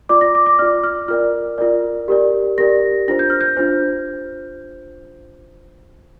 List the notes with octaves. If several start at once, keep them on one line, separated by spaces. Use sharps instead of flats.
F4 D5 D6
A#6
D6
D6
F4 D5 F6
F6
F4 A#4 D5 F6
F4 A#4 D5
G4 A#4 D5
G4 A#4 D5 A#6
D4 F4 C5 A#6
G6
F6
G6
D4 F4 C5